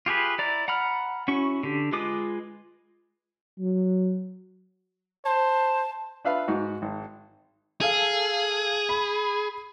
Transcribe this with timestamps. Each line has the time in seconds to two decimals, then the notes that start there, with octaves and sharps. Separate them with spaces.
0.06 F4 G4 G#4 B4
0.38 E4 D5 A#5
0.68 F#5 A#5 B5 F6
1.28 C#4 E4 F#4 C#6
1.63 D3 G4
1.93 G#3 F4 B4 D6 D#6
3.59 F#3
5.25 C5 A5
6.25 D4 F4 B4 E5 F5 B5
6.48 G#2 D#4 F#4
6.82 G#1
7.81 G#4 A4 F5
8.89 B5